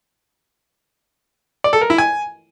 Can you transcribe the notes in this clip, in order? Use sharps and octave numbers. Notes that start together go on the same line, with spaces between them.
D5
A4
A#4
E4
G#5